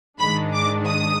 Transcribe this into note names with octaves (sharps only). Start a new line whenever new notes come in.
G#2 D#3 G#3 D4 B5
D6
D#6